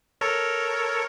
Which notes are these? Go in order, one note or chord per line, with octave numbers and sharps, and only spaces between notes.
A4 A#4 C#5